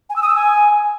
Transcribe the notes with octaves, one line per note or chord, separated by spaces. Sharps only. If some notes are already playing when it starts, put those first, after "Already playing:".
G#5
E6
D#6
E6
G#5